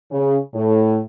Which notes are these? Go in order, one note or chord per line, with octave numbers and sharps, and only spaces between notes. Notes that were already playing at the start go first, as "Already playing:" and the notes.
C#3
A2